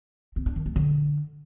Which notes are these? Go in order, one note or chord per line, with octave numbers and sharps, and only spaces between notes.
C4
D4
D#3
A3
D3